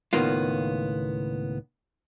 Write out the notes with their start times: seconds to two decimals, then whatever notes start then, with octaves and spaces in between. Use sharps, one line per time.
0.13 C#2 A2 D#3 A#3 B3 F4